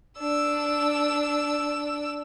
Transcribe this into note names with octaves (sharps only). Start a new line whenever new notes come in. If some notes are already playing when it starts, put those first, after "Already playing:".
D4 E6